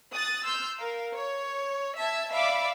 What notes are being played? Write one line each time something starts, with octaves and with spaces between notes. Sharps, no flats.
D#6 F#6 A6
C6 E6 F6 G6
A#4 F5
C#5
E5 A5 G#6
D5 E5 F5 B5 D6